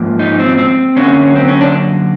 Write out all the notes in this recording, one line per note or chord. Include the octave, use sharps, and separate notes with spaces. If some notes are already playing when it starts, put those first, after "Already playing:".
Already playing: G#2 F3 A#3
D#4
C4
C4
F#2 D3 F#3 A#3 C#4
C4
C#4
D4